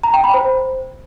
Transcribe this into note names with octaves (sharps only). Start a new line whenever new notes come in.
A#5
G5
B5
C5